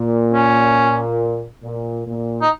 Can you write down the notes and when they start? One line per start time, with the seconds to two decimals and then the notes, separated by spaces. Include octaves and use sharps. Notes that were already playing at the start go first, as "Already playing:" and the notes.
Already playing: A#2
0.34 C#4
1.62 A#2
2.06 A#2
2.42 D#4